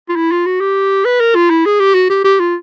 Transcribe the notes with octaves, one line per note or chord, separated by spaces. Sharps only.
F4
E4
F4
F#4
G4
B4
A#4
F4
E4
G#4
G4
F#4
G4
G4
F4